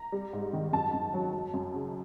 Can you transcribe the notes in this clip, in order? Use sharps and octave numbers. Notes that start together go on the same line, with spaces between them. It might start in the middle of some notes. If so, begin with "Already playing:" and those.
Already playing: A#5
G3
G#2
D#3
F#2 A5
F#2
F#3
F#3
F#2
C#3